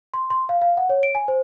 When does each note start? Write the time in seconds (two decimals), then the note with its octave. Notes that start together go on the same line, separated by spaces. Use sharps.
0.14 C6
0.30 C6
0.49 F5
0.62 F5
0.77 F#5
0.89 C#5
1.03 D7
1.15 G#5
1.28 C5